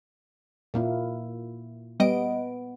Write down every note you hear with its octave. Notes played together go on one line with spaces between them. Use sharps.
A#2 A#3 E4
G3 B3 D#5 D7